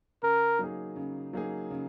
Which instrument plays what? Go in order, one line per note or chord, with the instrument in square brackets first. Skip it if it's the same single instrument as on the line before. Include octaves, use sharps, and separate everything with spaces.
[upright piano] C#3 [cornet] A#4
[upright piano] F#3 A#3 D#4 G#4
C#3
F#3 A#3 D#4 G#4
C#3